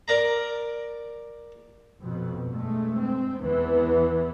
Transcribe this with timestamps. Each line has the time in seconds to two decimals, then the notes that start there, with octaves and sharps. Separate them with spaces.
0.08 A#4 D5 A#5
2.03 F2 B2
2.48 G2 G#3 A3
3.01 C4
3.40 E2 E3 B3